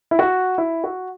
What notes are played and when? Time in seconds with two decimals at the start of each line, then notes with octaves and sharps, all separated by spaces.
0.11 E4
0.19 F#4
0.58 E4
0.84 F#4